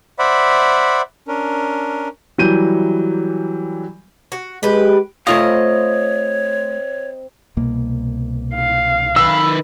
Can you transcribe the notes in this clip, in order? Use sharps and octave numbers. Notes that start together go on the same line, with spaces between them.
C5 D5 E5 F#5 B5
C#4 D4 A#4
E3 F#3 G3 G6 D#7
F#4
G#3 G4 B4
A3 C4 F4 C5 C#5 D#5 F5 B5
C2 B2 A#3
F5
D#3 B4 E6